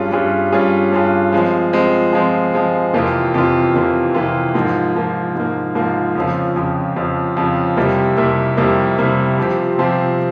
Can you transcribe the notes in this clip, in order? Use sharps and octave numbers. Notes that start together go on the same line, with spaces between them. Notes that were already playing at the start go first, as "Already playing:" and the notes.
Already playing: G2 G3 C#4 F4 G#4
G2 G3 C#4 F4 G#4
G2 G3 C#4 F4 G#4
G2 G3 C#4 F4 G#4
F3 G#3 C4
F3 G#3 C4
F3 G#3 C4
F3 G#3 C4
F2 C3 E3 A#3 F4
F2 C3 E3 A#3 F4
F2 C3 E3 A#3 F4
F2 C3 E3 A#3 F4
G#2 F3 A#3
G#2 F3 A#3
G#2 F3 A#3
G#2 F3 A#3
F2 C#3 F3
F2 C#3 F3
F2 C#3 F3
F2 C#3 F3
F2 C3 G3 A#3 E4
F2 C3 G3 A#3 E4
F2 C3 G3 A#3 E4
F2 C3 G3 A#3 E4
C3 F3 C4 G4
C3 F3 C4 G4